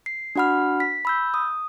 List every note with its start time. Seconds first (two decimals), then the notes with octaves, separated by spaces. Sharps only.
0.06 C7
0.36 D4 F#4 F#5 B5 F6
0.80 B6
1.05 B5 E6 G6
1.34 D#6